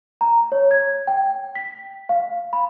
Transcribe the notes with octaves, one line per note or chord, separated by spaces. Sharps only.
A#5
C#5
G#6
G5
B6
F5
B5